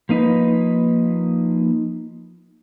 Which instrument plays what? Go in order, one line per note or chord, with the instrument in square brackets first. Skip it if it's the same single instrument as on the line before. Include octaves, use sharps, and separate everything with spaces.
[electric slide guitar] F3 A#3 D#4 B4